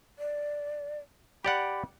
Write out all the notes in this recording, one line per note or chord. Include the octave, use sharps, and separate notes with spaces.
D5
G4 D5 F#5 B5